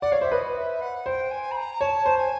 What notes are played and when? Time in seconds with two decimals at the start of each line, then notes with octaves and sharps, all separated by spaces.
0.01 D5 F#5
0.11 C#5 F5
0.21 C5 E5
0.32 B4 D#5
0.56 E5
0.81 F#5
1.06 C5 G5
1.30 G#5
1.51 B5
1.56 A#5
1.81 C#5 A5
2.06 C5
2.18 G#5